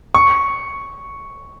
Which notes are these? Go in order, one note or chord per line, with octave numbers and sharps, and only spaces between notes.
C#6